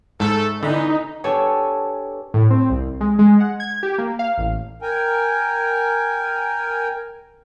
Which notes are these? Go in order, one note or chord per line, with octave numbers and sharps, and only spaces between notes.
G#2 A3 A4
D3 E3 B3 D#4
B3 D4 G4 A4 C#5 G#5
A2
C4
C2
G#3
G#3
F#5
G#6
G4
A#3
F5
A1
A#4 G5 G#5